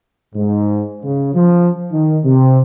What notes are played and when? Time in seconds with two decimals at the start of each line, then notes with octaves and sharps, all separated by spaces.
0.35 G#2
1.03 C#3
1.34 F3
1.92 D#3
2.25 C3